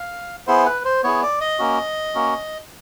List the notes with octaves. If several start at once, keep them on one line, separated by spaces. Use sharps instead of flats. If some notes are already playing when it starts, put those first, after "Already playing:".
Already playing: F5
B3 E4 G#4 C5
B4
C5
B3 E4 G#4 C#5
D5
D#5
A#3 C#4 F#4
A#3 C#4 F#4